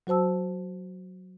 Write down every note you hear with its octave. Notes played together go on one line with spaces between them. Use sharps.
F#3 F#4 C5 A5 E6